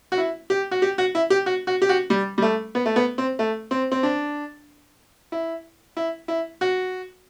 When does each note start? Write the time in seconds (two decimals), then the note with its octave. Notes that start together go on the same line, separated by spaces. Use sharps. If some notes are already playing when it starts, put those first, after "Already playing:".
0.12 F#4
0.18 E4
0.50 G4
0.71 F#4
0.82 G4
0.98 F#4
1.15 E4
1.30 G4
1.46 F#4
1.67 F#4
1.82 G4
1.89 F#4
2.10 G3
2.38 G3
2.42 A3
2.75 B3
2.85 A3
2.96 B3
3.18 C4
3.39 A3
3.71 C4
3.92 C4
4.03 D4
5.32 E4
5.97 E4
6.28 E4
6.61 F#4